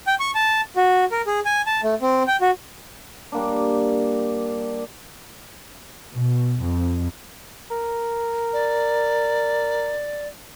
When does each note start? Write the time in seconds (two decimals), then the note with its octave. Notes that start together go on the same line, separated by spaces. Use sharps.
0.07 G5
0.20 C#6
0.35 A5
0.76 F#4
1.12 A#4
1.27 G#4
1.45 G#5
1.67 A5
1.83 A3
2.01 C4
2.27 G5
2.41 F#4
3.32 G3 A#3 D4
6.12 B2
6.62 F2
7.71 A#4
8.53 D5